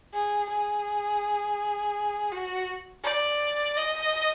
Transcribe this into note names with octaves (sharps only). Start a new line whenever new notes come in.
G#4
G#4
F#4
D5
D#5